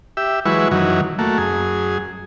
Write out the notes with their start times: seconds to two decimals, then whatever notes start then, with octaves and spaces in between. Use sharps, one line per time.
0.17 G4 E5
0.45 E3 F#3 G#3 E4 B4 C#6
0.71 F#2 D#3 E3 F#3
1.19 A3 A#3 F#4
1.38 F#2 G#4